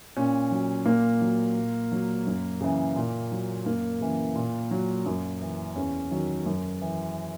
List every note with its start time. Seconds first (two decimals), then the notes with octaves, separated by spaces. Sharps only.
0.17 A#2 C#4
0.51 F#3
0.86 A#2 A#3
1.21 F#3
1.56 A#2
1.92 F#3
2.27 F#2
2.61 C#3 E3
2.96 A#2
3.32 F#3
3.66 F#2 A#3
4.00 C#3 E3
4.36 A#2
4.71 F#3
5.06 F#2
5.42 E3
5.76 E2 C#4
6.11 D#3 F#3
6.46 F#2
6.81 E3